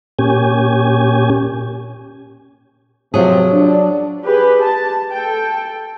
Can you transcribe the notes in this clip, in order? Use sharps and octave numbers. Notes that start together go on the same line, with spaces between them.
A#2 C#4 G4 G#5
C3 F3 F#3 G#4
D4
G4 G#4 B4
A5
A4 G5